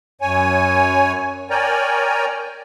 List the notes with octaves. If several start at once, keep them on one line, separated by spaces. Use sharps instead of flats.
F#2 C#5 G#5
A#4 C#5 D5 G5 G#5 A#5